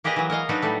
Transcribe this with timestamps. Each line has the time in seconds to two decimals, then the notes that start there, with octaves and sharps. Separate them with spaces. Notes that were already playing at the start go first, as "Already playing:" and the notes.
0.04 A#3 G4 G#4 B4 D#5
0.16 E3 F#3
0.30 A#4 C#5 D#5 F5
0.49 F#3 B3 D4 D#4 F#4 B4
0.62 A2 G3 A3